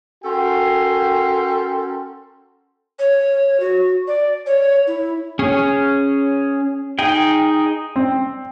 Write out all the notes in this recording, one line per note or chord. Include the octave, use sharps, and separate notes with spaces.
C#4 F#4 A4 A#4 G5 C6
C#5
F#4
D5
C#5
E4
C#4 G#4 C#5
D#4 G#4 G5
C4